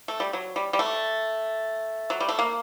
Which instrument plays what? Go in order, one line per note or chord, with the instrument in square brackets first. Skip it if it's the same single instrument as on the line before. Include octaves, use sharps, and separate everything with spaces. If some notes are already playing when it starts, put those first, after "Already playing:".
[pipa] A3
G3
F#3
G3
G3
A3
F#3
G3
A3
A#3